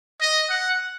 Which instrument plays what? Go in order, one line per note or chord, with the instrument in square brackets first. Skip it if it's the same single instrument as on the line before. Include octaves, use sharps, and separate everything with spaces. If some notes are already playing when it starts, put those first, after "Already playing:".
[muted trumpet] D#5
F#5